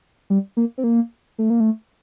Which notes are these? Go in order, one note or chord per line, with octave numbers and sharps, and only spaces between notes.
G3
A#3
C4
A#3
A3
A#3
A3